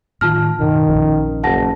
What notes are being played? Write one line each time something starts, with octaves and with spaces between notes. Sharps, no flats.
A2 D#3 F4 A5 F6
F#2 B2 D#3
A#1 F3 C#4
F#1 F#5 A5 A#6